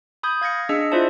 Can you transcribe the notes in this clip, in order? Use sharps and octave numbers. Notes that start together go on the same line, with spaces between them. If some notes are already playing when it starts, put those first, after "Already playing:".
B5 D#6 G6 G#6
F5 G#6 A#6 C#7
D4 G#4 D#5 E6 C#7
E4 F4 C5 D5 E5 A5